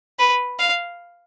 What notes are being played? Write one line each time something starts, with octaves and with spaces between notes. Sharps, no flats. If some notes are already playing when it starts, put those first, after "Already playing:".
B4
F5